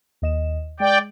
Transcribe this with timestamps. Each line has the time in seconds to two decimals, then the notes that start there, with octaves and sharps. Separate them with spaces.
0.22 D#2 D#5 E7
0.80 G#3 D5 G5